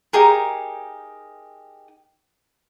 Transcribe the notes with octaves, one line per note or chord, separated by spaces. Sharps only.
D#4 G4 G#4 A#4